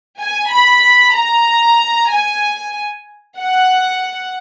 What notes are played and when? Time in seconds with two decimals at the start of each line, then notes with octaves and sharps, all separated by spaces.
0.20 G#5
0.51 B5
1.15 A#5
2.11 G#5
3.39 F#5